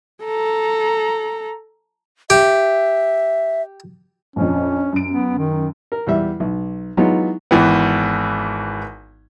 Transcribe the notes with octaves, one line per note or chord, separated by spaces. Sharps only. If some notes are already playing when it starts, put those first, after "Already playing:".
A4 A#5
G4 E5
A#1 F2 C#4
F#2 D7
B3
D#3
A#4
E2 G3 E5
B1
E3 F#3 G#3 B3 D#4 F4
G#1 E3 B3